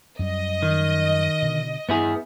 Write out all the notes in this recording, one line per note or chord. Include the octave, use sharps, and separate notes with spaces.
F#2 G3 D#5
D#3
B2 D3
G2 B3 E4 G#4